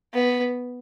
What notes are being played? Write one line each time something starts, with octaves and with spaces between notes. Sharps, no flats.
B3